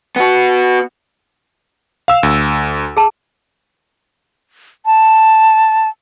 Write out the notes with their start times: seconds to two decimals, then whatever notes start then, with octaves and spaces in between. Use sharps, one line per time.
0.16 B3 F#4
2.08 F5 E6
2.23 D2
2.97 G#4 A5
4.86 A5